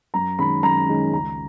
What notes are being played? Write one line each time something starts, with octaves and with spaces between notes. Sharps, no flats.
F#2 A#5
D#3 G#3 C#4 B5
F#2 A#5
D#3 G#3 C#4
C#2 A#5